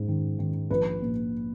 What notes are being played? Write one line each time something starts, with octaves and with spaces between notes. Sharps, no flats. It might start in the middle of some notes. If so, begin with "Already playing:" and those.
Already playing: G#2
D#3
D#3
A#1 B4
A#2